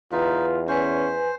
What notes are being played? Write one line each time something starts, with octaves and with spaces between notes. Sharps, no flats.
E2 D#4 F4 B4
C#4 B4 C5 G#5